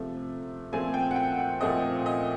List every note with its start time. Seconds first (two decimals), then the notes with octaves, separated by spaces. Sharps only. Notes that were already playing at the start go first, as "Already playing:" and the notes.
Already playing: C3 F3 A3
0.72 A#2 F3 A3 C4 G#5
0.94 G5
1.11 F#5
1.16 G5
1.39 F#5
1.61 A#2 F3 A3 C4 D#5
2.06 D#5